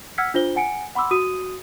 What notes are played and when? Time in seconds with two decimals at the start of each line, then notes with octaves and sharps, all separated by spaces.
0.18 F#5 E6 F6 G#6 B6 C#7
0.34 D4 F4 C5 G7
0.56 F#5 G#5 C#7 D7
0.95 F#5 B5 C6 D6 E6
1.11 F#4 D#6 D#7